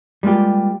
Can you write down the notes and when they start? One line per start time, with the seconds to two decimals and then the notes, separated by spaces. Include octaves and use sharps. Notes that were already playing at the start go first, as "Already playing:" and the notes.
0.23 G3 G#3 A#3 F4 G4